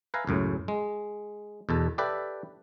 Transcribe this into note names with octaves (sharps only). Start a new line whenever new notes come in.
B4 E5 F5 G#5 A#5
C#2 F#2 A2
G#3
E2 B2 A4
G4 A4 B4 D5 E5